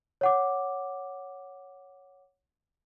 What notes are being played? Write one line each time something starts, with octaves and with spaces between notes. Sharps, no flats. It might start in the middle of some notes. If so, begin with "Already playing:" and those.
C#5 F#5 D6